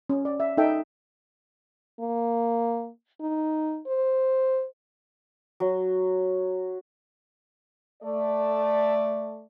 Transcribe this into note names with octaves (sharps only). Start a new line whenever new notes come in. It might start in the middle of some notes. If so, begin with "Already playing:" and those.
C#4
D5
E5
D#4 A4 E5 G5
A#3
D#4
C5
F#3
A3 D5